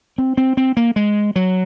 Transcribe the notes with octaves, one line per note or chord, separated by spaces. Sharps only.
C4
C4
C4
A#3
G#3
F#3